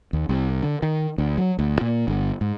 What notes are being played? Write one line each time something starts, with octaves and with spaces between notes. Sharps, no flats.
D#2
C2
D3
D#3
D2
F#3
D2
A#2
G1
G#2